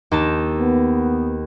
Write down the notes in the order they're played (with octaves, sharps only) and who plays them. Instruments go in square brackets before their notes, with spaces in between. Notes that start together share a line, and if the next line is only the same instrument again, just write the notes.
[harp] D#2 D#4 A5
[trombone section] B3